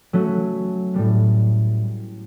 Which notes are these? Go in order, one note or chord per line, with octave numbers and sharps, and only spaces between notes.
F#3 A3 C#4 F#4
A2 G3 B3